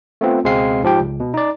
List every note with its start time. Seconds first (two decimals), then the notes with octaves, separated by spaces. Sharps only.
0.21 A3 B3 C4 F4
0.44 C#2 B2 G#3 C4 F5 C7
0.83 G#2 F3 G4 G5
1.00 C#2
1.20 B2
1.34 D#4 D5